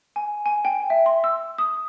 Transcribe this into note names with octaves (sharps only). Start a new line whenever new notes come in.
G#5
G#5
G5
E5
C6
E6
D#6